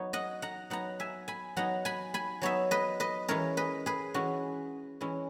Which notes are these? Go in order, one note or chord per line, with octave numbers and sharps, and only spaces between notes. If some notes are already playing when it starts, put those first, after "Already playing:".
Already playing: F#3 B3 D#4 C#5
D#5 F#5
F#5 A#5
F#3 B3 D#4 F#5 A#5
E5 G#5
G#5 B5
F#3 B3 D#4 F#5 A#5
G#5 B5
G#5 B5
F#3 B3 D#4 C#5 E5
B4 D#5
B4 D#5
E3 G#3 C#4 E4 A#4 C#5
B4 D#5
G#4 B4
E3 G#3 C#4 E4 F#4
E3 G#3 C#4 E4